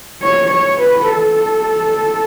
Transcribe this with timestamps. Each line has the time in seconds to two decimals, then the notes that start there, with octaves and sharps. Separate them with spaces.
0.22 C#5
0.51 C#5
0.81 B4
1.10 A4